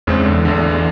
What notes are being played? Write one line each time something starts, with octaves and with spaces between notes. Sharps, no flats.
E2 C#3 G#3 C4
D3
A1 D3